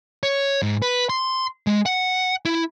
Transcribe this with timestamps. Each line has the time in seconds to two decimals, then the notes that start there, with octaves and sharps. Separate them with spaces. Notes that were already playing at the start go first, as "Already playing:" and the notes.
0.23 C#5
0.62 G#2
0.82 B4
1.10 C6
1.67 G#3
1.86 F#5
2.45 E4